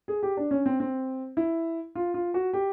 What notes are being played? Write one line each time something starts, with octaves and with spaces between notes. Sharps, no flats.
G#4
G4
D4
C#4
C4
C4
E4
F4
F4
F#4
G4